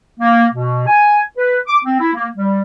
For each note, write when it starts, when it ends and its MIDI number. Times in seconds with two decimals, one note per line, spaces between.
0.19 0.46 58
0.52 0.85 47
0.86 1.20 80
1.37 1.58 71
1.67 1.78 86
1.84 1.98 60
2.00 2.13 64
2.13 2.27 58
2.36 2.61 55